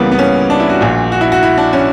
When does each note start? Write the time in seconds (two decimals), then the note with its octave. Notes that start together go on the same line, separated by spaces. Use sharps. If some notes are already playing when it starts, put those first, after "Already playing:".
Already playing: C#2 C#3 E3 G3 A#3 B3
0.12 B3
0.19 C#4
0.50 D4
0.60 E4
0.70 F#4
0.81 A#1 A#2
1.12 F#4
1.21 E4
1.32 F#4
1.43 E4
1.58 D4
1.73 C#4